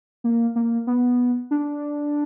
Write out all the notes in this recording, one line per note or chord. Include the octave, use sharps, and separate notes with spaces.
A#3
A#3
B3
D4